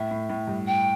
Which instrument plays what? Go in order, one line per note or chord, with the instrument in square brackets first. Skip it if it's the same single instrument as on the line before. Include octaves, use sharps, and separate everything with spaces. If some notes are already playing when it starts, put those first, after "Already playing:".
Already playing: [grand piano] A2 [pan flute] E5
[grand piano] A2
A2
G2
[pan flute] G5